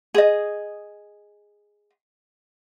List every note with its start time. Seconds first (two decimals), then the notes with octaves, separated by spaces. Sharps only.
0.14 G#4 D#5